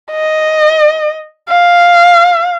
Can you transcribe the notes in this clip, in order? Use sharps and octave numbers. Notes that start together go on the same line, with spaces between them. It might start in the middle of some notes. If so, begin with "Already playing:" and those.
D#5
F5